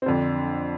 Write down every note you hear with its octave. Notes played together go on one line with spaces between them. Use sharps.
C4
F2 D3 D4